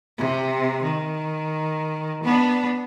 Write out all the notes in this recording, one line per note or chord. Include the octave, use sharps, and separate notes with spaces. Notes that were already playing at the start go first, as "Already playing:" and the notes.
C3
D#3
B3 D4